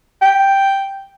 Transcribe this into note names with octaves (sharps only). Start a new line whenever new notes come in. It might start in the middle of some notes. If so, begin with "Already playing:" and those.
G5